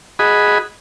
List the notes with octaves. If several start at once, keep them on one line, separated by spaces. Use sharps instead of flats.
F#4 G#4 D#5 B5